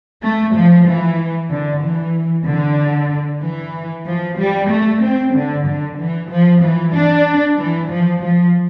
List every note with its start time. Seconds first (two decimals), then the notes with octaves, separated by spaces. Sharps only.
0.22 A3
0.55 F3
0.86 E3
1.50 D3
1.83 E3
2.46 D3
3.41 E3
4.07 F3
4.38 G3
4.70 A3
5.02 C4
5.34 D3
5.67 D3
5.99 E3
6.30 F3
6.63 E3
6.94 D4
7.58 E3
7.90 F3
8.23 F3